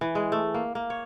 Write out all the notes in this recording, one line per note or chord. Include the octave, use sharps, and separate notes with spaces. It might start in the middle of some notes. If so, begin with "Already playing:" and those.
E3
G#3
A3
A#3
A#3
C#5